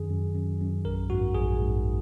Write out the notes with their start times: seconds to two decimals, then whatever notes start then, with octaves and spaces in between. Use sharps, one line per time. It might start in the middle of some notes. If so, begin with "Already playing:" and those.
Already playing: F#2 D#3 G#4
0.10 F#2
0.35 F#2
0.60 F#2
0.85 A#1 A#4
1.10 G#2 F#4
1.34 A#1 G#4
1.60 G#2